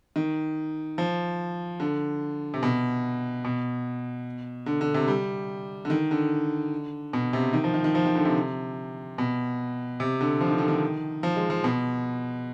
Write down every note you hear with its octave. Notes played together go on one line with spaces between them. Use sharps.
D#3
F3
D3
C3
B2
B2
D3
D3
C3
G3
D3
D#3
D3
B2
C3
D#3
F3
D#3
D#3
F3
D#3
D3
C3
B2
C3
D3
F3
D#3
D3
D#3
F3
G#3
F3
B2